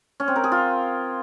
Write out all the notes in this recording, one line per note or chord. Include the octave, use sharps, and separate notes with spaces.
C#4
C4
A#4
G#4
F4